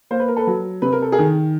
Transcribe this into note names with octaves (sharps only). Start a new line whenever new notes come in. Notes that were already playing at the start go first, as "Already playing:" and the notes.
A#3 C5
B4
A#4
A4 B4
F#3
C3 B4
A#4
A4
G#4 A#4
D#3